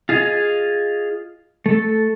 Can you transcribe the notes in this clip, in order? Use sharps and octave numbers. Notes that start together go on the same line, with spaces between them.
F4 G#4 D#5 F5 G#5
A3 A4